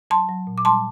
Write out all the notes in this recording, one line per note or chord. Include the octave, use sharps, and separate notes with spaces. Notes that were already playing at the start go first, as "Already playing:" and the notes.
F#3 A5 C6
F#3
A#2
D6
G3 A5 C6